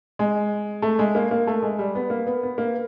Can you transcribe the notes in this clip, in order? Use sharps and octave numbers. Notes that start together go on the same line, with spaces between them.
G#3
A3
G#3
A#3
A#3
A3
G#3
G3
B3
A#3
B3
B3
A#3